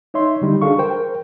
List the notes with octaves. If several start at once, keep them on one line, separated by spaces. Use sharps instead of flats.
D#4 C#5 E5 C6
D3 G3 D#4
D4 F#4 G#4 A4 F5 C#6
A#4 C5 G5